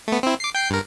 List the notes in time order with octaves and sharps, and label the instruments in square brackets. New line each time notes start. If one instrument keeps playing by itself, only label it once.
[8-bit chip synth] A3 B3
C4 E4
D6 C7
G5 G6 C7
G2 A#4